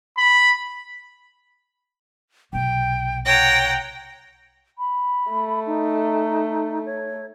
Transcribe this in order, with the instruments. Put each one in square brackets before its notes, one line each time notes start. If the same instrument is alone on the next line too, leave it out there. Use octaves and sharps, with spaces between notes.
[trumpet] B5
[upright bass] B1 C3 [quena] G5
[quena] C#5 [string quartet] F#5 A#5 A#6 [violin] G5
[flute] B5
[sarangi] A3
[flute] D#4
C#5